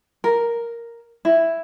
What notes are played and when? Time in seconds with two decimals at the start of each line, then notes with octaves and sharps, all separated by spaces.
0.24 A#4
1.25 E4